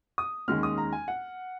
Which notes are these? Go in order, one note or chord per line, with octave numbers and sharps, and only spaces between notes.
D#6
D#2 D#3 G#3 C#4 F6
D#6
A#5
G#5
F#5